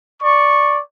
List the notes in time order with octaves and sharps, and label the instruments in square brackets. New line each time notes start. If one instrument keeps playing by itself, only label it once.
[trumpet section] D5 C#6